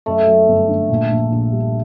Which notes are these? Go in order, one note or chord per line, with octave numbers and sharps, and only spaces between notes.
F#2 A3
F#3
G1
D3
A#2
A#1
A#1
G3